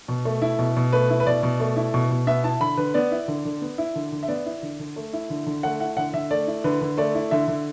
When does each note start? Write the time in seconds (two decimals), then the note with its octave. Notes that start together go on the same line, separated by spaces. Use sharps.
0.08 B2
0.25 A3
0.42 E4
0.59 B2
0.76 B2
0.92 A3 B4
1.10 E4
1.20 B4
1.26 B2 D5
1.43 B2
1.60 A3
1.76 E4
1.94 B2
2.11 B2
2.27 B3 E5
2.44 E4 A5
2.60 D3 B5
2.77 D3 B4
2.94 B3 D5
3.12 E4
3.28 D3
3.45 D3
3.62 B3
3.78 E4
3.95 D3
4.12 D3
4.23 E5
4.28 B3 D5
4.46 E4
4.63 D3
4.79 D3
4.96 A3
5.13 E4
5.30 D3
5.46 D3
5.63 A3 F#5
5.80 E4 F#5
5.97 D3 F#5
6.14 D3 E5
6.31 A3 D5
6.47 E4
6.64 D3 B4
6.81 D3
6.98 A3 D5
7.15 E4
7.31 D3 E5
7.48 D3